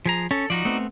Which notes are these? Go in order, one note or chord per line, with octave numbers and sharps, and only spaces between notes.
F3 G#4 A#5
C#4 A4
F3 D#4 F#4 D5
A3 B3 C4